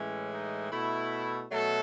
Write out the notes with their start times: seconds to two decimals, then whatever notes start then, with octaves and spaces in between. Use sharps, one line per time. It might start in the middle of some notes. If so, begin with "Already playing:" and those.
Already playing: A2 E3 G#3 C#4
0.31 D#4
0.71 B2 A3 E4
1.52 B2 F#3 A3 A4